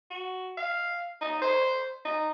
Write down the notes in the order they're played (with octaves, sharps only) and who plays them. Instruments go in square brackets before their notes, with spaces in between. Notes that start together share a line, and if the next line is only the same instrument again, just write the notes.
[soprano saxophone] F#4
F5
D#4
C5
D#4